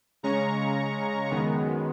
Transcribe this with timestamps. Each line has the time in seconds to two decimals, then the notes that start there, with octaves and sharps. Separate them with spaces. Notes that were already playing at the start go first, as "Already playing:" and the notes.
0.23 C#3 G#3 C#4 A#5 C#6
1.31 F#2 D#3 G#3 B3